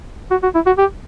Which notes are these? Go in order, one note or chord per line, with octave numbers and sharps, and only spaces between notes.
F#4
F#4
E4
F#4
G4